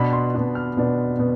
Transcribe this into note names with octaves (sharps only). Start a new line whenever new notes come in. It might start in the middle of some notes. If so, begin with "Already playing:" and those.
Already playing: B2 B3 D4 B5
C6
B2 B3 D4
F6
B2 B3 D4
B2 B3